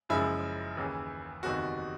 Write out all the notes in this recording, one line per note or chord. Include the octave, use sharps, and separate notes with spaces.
F#1 F#2 C#3 F3 G#3 E4
D#2 C#3 E3
F#1 E2 C3 D#3 G3 F#4